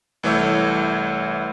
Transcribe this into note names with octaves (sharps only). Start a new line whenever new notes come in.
C2 E3 A3 C#5 E6 G6